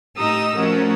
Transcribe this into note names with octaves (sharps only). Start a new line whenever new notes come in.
A2 D#4 G4 A#5 D#6 E6
F3 A3 C#4 F#4 A#4